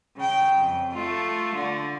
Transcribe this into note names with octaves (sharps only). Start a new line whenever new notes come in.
C#3 G5
F2
A3 F4
D3